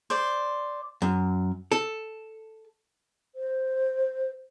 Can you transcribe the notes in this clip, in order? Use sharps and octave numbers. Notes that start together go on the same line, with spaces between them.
C5 D5
F#2
A4
C5